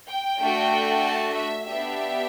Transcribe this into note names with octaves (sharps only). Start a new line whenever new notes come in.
G5
A3 D4 F#4
A5
E5
B3 D4 G4 E5